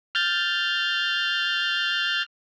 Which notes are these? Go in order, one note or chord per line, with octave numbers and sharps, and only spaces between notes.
F6 G6 A6